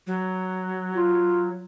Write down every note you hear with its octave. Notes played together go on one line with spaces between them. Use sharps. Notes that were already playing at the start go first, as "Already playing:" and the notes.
F#3
F4